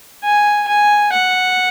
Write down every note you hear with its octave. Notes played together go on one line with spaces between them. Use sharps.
G#5
G#5
F#5